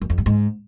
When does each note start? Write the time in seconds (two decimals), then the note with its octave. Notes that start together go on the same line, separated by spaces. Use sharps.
0.01 F#2
0.10 F2
0.18 G2
0.26 G#2